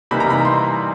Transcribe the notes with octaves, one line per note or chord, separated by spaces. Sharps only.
C3 E3 G3 A#3 D#4 B5
A#5
B5
C6